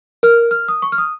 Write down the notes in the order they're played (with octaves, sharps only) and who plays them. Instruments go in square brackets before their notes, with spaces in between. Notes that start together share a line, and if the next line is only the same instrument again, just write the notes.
[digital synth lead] A#4 [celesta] F6
[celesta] F6
D#6
C#6
F6
D#6